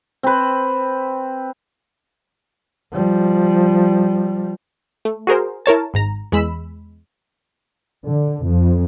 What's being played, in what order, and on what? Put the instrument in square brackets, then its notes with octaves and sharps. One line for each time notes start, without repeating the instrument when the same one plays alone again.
[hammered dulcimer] C4 B4
[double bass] F3 G3
[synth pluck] A3
F#4 G#4 A#4 C5
E4 A#4 C#5 A5
G#1 G#2 A#5
E2 G#3 B5 E6
[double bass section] D3
F2